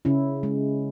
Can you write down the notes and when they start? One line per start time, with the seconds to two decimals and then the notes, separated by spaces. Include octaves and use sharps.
0.05 C#3 C#4 E4
0.43 G#3